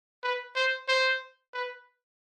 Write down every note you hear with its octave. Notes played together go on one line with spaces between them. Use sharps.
B4
C5
C5
B4